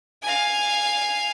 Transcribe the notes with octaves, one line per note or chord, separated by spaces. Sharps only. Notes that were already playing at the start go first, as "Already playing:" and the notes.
F5 G#5